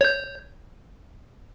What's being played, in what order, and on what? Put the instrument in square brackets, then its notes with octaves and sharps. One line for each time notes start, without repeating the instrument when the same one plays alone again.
[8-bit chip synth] C#5 G6